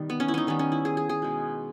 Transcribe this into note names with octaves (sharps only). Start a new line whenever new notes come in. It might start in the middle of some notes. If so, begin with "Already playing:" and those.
Already playing: B2 D#3 G3 D#4
B3
C#4
E4
C#4 D#4
D#3 G3 B3 C#4
C#4
E4
G#4
G#4
G#4
B2 G#3